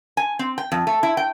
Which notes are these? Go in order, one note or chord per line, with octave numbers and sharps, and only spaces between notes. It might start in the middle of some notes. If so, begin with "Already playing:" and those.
G#5
C4
G5
F2
A3
E4
G5